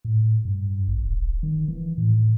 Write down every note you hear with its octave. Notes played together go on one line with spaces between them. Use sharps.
A2
G2
A1
D#1
D#3
E3
A2